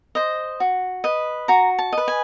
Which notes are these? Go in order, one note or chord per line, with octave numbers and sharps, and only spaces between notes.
C5 D#5
F#4
B4 D#5
F#4 A#5
A5
B4 D#5
G#5